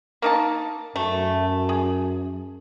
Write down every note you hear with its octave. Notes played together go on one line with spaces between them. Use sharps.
A#3 D#4 A5
F#2 A3
G#4